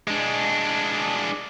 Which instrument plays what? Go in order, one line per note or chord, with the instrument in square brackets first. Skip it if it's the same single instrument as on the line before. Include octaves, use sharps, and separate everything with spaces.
[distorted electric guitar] G#3 D4